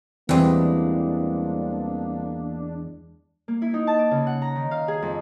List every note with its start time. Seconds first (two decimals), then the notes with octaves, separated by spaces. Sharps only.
0.29 E2 E3 G3 G#3 A#3 C4 D4
3.48 A#3
3.62 E4
3.74 D#4
3.87 A5
3.99 D6
4.11 C#3
4.27 F#5
4.42 A#5
4.56 D#3
4.71 F5
4.88 G#4
5.02 F2